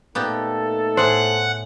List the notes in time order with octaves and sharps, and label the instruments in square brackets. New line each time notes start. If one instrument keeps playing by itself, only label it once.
[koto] A#2 B3 G4 [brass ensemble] A3 D#4 A4
[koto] A2 G#4 [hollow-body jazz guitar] C5 [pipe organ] F#5